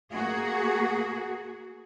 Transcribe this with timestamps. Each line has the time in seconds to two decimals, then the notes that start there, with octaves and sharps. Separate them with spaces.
0.12 A#3 F#4 G#4